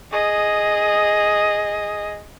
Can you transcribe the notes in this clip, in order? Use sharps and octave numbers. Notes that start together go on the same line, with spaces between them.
G#4 D#5